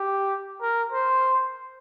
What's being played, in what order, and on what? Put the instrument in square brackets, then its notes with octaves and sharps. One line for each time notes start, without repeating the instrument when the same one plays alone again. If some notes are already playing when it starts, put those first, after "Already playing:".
Already playing: [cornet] G4
A#4
C5